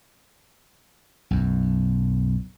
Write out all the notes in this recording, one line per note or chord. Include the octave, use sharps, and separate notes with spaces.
B1 F#2